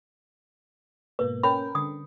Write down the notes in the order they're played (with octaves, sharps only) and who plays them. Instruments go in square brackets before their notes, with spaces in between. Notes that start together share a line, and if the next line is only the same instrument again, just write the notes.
[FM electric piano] G#2 B2 A#3 [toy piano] B4
[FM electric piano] C#4 A#4 G5 [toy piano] B5
[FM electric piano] D3 [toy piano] D#6